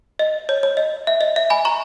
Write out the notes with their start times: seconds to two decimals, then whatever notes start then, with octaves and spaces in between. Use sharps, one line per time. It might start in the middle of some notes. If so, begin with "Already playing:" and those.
0.19 D#5
0.49 C#5
0.63 C#5
0.77 D#5
1.07 E5
1.21 D#5
1.36 E5
1.50 G#5 B5
1.65 A#5 C#6